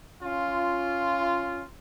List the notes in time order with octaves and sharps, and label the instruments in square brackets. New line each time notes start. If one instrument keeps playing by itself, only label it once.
[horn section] C#4 F4